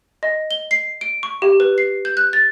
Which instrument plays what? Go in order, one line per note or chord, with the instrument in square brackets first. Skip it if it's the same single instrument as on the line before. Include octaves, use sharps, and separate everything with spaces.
[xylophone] D#5
G7
C7
D7
C#6
G4
B4
C7
G6
F#6
A6